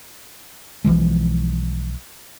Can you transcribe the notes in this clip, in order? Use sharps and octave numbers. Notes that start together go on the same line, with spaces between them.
B1 E3 F3 G#3